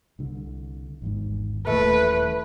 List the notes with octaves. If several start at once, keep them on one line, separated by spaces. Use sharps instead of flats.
C2 D3
G#1 E2 G#2
D#1 A#2 E3 A3 B4